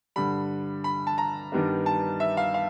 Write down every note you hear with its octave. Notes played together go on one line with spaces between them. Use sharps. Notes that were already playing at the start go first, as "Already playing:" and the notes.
G2 D3 G3 B5
B5
A5
A#5
G2 D#3 G3 B3 D4
A5
E5
F5
F5